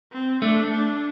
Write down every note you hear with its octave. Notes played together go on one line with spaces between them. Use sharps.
C4
A3 D4
D4